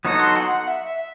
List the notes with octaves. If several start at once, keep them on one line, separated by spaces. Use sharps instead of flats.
F#3 B3 D#4 F#4 A4 D#6
C6
F#5
F#5
E5
E5